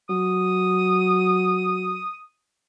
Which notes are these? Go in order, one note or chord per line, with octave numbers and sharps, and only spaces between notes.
F#3 D#6